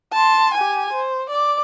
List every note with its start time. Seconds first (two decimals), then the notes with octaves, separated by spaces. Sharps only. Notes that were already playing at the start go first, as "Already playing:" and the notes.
0.13 A5 C6
0.54 G4 G#5
0.93 C5
1.30 D5 D6